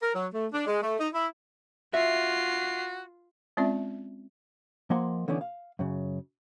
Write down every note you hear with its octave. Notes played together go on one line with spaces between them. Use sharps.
A#4
F#3
A3
D4
G#3
A3
D#4
E4
F4 F#4 E5 C7
G#3 C4 C#4 F4 D5 E5
F3 A#3 D#5 F#5 G#5 C6
D3 E3 B3 C#4 E4
F5
F#2 C#3